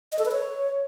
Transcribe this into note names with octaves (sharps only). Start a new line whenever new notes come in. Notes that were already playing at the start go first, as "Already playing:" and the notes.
D#5
A4
B4
C#5